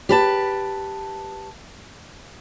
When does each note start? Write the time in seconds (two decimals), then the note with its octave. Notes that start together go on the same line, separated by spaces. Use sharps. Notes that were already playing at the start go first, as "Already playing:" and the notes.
0.09 G4 B4 A5